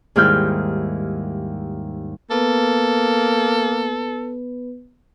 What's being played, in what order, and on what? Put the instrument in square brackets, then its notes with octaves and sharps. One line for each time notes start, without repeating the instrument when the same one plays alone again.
[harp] D#2 G#2 G3 E4 F6 G6
[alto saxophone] A#3 [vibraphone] B3 B4 [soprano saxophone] A4